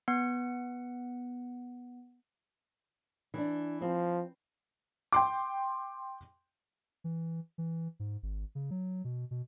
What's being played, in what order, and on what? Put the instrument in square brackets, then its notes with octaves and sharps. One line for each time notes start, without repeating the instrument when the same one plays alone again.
[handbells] B3 F#5
[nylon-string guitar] E3 D4
[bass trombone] F3 [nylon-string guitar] C4
[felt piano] G5 C6 D6
[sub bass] E3
E3
G#2
G#1
C#3
F#3
B2
B2